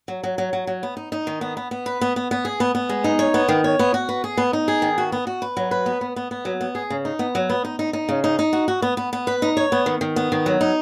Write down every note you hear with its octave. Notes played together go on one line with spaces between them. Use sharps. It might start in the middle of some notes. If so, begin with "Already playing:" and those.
F#3
F#3
F#3
F#3
F#3
B3
D#4
D#4
D#3
B3
B3
B3
B4
B3
B3
B3
G#4
B3
B3
G#3
D#4
C#5
B3
D#3
C#5
B3
F#4
B4
G#4
B3
D#4
G#4
D#3
F#4
B3
F#4
B4
F#3
B4
B3
B3
B3
B3
F#3
B3
G#4
C#3
D#4
B3
F#3
B3
D#4
D#4
D#4
C#3
D#4
D#4
F#4
F#4
B3
B3
B3
B4
D#4
C#5
B3
D#3
D#3
B3
D#3
F#3
D#4